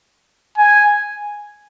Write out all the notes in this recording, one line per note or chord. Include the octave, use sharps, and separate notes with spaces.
G#5